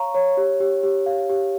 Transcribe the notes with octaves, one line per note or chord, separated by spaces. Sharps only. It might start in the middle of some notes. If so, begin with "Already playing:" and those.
Already playing: C#5 F5 A#5 C#6
C#5
G4
G4
G4
F5
G4